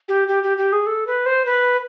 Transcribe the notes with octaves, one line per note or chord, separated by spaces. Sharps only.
G4
G4
G4
G4
G#4
A4
B4
C5
B4